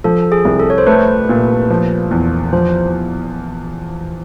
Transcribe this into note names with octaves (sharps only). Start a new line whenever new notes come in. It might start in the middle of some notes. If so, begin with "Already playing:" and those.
F3 A4
G#4
C2
A4
C#5
C5
A3 B4
A#2
F3
E2
F3 C5